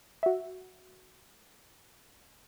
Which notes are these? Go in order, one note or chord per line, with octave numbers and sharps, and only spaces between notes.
F#4 E5